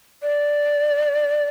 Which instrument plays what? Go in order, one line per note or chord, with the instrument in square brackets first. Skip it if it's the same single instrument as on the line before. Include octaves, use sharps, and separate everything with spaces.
[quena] D5